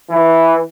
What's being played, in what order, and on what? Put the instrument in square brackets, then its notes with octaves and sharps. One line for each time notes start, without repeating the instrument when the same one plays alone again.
[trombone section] E3